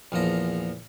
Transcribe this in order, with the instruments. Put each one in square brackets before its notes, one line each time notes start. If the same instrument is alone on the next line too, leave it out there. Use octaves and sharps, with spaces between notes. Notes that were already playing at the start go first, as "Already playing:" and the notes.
[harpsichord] A#1 E2 F3 A#5